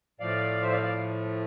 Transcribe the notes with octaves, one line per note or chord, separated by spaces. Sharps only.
A2 F3 A3 D5 F5
C5 E5
D5 F5
D5 F5